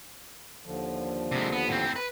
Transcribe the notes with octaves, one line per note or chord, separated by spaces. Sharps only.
D#2 D3 F3
C3 G#3
B3
A2 C4
B4